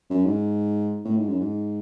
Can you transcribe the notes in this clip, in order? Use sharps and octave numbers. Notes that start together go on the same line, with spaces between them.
F#2
G#2
A2
G#2
F#2
G#2